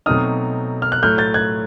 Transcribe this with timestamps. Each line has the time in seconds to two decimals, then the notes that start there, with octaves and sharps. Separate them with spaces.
0.06 B2 F#3 A3 C4 D#4 D#6 F6
0.82 F6
0.92 F#6
1.02 A2 F#3 A3 F6 G6
1.18 G6 A6
1.34 F#6 G#6